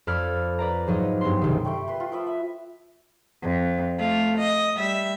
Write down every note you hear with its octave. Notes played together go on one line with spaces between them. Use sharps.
F2 A4 D5 B5 F6 G#6
B4 D5 A#5
G#2 F3 F#3 D#4 D#5
G2 B3 C6
F#1 B1 C3 D#3
G3 A3 C6 D6
B4 C6
F4
F3 B4 E5
E5
F2
A3 F4
D#5
G3 E5